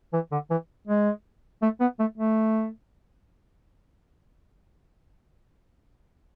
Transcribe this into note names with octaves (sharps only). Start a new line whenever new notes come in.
E3
D3
E3
G#3
A3
B3
A3
A3